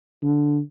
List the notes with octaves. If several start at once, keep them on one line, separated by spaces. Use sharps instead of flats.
D3